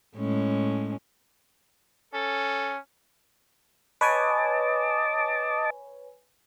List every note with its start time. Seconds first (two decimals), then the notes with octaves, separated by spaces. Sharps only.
0.15 A2 G#3 C#4
2.14 C#4 A4
4.01 B4 C#5 D#5 G#5 A5 D6